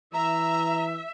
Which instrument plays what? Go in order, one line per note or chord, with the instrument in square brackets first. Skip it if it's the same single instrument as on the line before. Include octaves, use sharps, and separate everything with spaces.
[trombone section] E3 [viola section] E5 [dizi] A#5